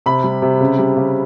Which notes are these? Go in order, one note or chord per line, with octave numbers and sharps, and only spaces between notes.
C3 B5
G3
C3
C#3
G3
C#3